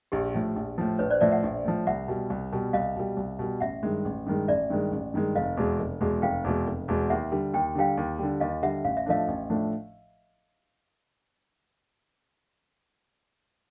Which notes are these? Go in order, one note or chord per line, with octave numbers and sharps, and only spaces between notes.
A#1 G4
A2 F3
A#1
A2 F3
A#1 B4 C#5
C5 D5
A2 F3 D5 E5
E5 F#5
A#1
A2 F3
C2 E5 F#5
B2 G3
C2
B2 G3
C2 D#5 F5
B2 G3
C2
B2 G3
A1 E5 F#5
G2 D#3 G#3
A1
G2 D#3 G#3
A1 D5 E5
G2 D#3 G#3
A1
G2 D#3 G#3
F1 D#5 F5
E2 B2 G#3
F1
E2 B2 G#3
F1 F5 G5
E2 B2 G#3
F1
E2 B2 G#3
D#2 E5 F#5
D3 G3
D#2 G5
D3 G3 F5 G5
D#2
D3 G3
D#2 D#5 F5
D3 G3 E5 F#5
A1 F5
E5
A2 F3 A3 D4 D#5 F5
A1
A2 F3 A3 D4